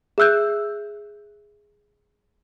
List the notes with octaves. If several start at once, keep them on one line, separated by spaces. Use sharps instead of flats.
G#4 E5 E6 F#6 G6